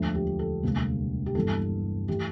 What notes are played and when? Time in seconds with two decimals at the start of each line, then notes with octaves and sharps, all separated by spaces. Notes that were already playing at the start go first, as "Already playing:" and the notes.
Already playing: E1 D2 D3 F3 A3
0.15 G4
0.39 A4
0.63 E1 D2 C3 G3 A#3
1.26 G4
1.35 G1 G2 E3 A#3 A4
2.08 E3 A3 G4